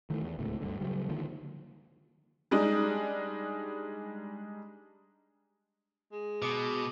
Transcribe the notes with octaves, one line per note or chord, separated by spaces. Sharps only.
D#3 E3 A3
E2
D1 C#2 A2
D2 G2 D3
C#3 F#3 G3
D3 D#3 F3 A#3
G3 G#3 D4 D#4
G#3
B2 D6 D#6